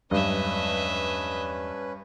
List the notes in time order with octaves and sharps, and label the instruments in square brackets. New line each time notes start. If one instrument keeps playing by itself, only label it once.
[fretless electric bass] E2 F#3 G#3 [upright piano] G2 [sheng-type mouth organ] C#4 B4 [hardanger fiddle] D#5 E5